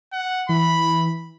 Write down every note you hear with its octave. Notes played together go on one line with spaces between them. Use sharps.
F#5
E3 B5